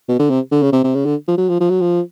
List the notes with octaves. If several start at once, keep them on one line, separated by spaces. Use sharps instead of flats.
B2
D3
C3
D3
C#3
C3
C3
C#3
D3
F3
F#3
F3
F3
F#3
F3